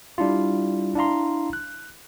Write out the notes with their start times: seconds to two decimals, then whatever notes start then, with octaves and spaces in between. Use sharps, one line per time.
0.18 G3 D4 E4 F4
0.96 D4 E4 F5 A#5 C6
1.53 F#6